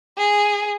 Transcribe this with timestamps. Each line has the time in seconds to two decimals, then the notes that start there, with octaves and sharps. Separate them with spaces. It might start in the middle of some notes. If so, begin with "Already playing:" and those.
0.18 G#4